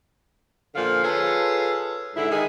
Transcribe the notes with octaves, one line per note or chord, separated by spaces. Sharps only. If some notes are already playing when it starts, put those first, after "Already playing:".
A#2 D3 F3 F5
F4 G#4 A4 B4 C#5
G#2 D3 E4
D#3 G#3 G#4